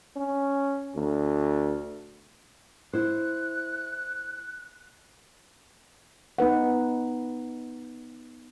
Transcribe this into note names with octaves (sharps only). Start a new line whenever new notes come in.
C#4
D2
E4 C5 F#6
B3 D#4 B4 F#5